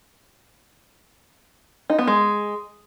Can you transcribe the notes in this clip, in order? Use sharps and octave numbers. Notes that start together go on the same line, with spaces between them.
D#4
B3
G#3